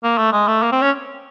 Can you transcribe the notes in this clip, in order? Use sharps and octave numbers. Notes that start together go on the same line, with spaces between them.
A#3
A3
G#3
A3
A#3
C4
C#4